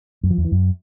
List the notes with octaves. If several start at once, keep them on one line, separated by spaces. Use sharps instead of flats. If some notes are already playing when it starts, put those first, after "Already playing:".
F#2
F3
E2
E3
F#2